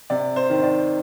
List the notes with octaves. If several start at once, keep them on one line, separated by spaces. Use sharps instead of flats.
C3 D5
C5
D#3
D5